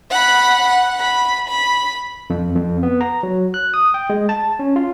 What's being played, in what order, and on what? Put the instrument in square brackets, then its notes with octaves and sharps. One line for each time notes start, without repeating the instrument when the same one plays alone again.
[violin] F#5 B5
F#5
B5
B5
[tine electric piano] F2
F2
B3
A#5
F#3
F#6
D#6
G5
G#3
A5
C#4
F4